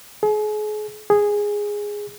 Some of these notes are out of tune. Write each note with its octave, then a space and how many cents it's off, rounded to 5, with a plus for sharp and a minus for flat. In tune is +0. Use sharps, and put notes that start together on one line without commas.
G#4 +35
G#4 -10